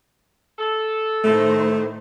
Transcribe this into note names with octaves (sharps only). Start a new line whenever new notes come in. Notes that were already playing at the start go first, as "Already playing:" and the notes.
A4
A2 D#3 A3 C5